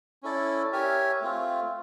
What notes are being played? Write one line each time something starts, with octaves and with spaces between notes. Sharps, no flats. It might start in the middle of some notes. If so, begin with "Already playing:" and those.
C#4 E4 A4 D5
G4 A#4 C#5 E5 G#5
A3 C4 F4